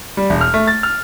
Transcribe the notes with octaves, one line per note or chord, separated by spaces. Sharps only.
G3
E1
F6
A3
A6
F6